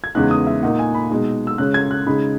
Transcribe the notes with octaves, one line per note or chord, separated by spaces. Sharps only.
G#6
E2 C#3 G#3 B3 D#4 F#6
D#6
E5
A#2 A#3 D#4 F#5
G#5
B5
B2 G#3 D#4
E6
C#3 G#3 C#4 F#6
G#6
F#6
C#3 G#3 D#4 B5